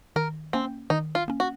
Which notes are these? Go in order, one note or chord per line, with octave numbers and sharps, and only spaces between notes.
D#3 A#4
A#3 C4 C#4
D#3 D#4
F4
A#3 C#4
F#4